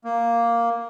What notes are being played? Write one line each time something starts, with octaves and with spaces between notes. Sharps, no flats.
A#3